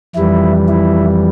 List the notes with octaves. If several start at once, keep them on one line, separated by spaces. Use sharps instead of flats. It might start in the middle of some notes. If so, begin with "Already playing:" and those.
F2 E3 G3 E4
E4